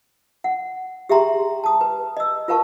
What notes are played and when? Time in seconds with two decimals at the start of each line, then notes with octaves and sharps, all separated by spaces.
0.44 F#5
1.09 G4 G#4 E5 G5 A#5 C6
1.64 A5 D#6
1.81 B4
2.17 D#5 E6
2.48 F4 A#4 B4 F5 A5 C#6